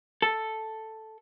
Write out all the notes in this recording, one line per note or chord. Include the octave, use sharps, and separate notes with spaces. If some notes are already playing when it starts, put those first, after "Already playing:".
A4